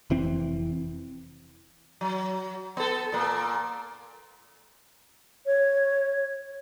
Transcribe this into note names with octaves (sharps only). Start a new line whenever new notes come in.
F1 E3 C4
F#3
B3 A4
A#2 A#3
C#5